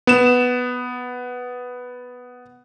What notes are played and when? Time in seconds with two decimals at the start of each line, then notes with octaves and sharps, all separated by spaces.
0.07 B3 E7